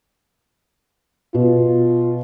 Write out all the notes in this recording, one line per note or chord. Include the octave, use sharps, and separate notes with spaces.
B2 F4